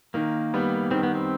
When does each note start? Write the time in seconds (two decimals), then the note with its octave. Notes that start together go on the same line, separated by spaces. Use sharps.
0.14 D#3 A#3
0.54 G3 B3
0.91 D#3 C4
1.03 B3
1.15 C4